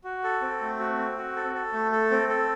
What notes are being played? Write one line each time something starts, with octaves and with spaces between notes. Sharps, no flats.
F#4
A4
C4
A3
F#4
C4
F#4
A4
A4
A3
A4
C4
A4